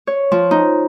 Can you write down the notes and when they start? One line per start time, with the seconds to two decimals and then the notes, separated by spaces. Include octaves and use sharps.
0.07 C#5
0.32 F3
0.51 D#4